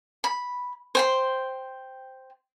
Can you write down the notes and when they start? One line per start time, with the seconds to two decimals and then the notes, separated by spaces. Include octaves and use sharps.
0.24 B5
0.95 C5 G5 C6